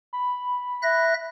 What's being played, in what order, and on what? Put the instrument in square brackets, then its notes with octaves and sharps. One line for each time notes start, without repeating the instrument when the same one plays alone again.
[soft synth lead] B5
[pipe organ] E5 F#6 A#6